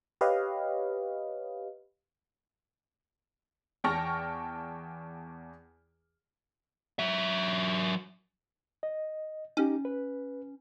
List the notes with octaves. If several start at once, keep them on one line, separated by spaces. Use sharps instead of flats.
G4 B4 C#5 D#5 F5
E2 G5 A5 C#6 F6 A#6
F#3 E5
D#5
C#4 D#4 G4
B4